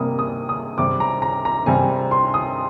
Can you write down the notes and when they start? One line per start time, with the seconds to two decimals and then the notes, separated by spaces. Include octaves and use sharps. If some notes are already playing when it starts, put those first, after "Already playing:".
Already playing: C3 G3 A#3 D#6
0.19 D#6
0.49 D#6
0.77 C3 G3 C4 D6
1.00 A#5
1.22 A#5
1.45 A#5
1.66 C3 G3 C4 G#5
2.11 C6
2.34 D#6